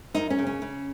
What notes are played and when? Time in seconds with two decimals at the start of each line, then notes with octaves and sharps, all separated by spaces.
0.14 F#2 D#4
0.30 C#4
0.39 C#3
0.47 C#4
0.62 C#3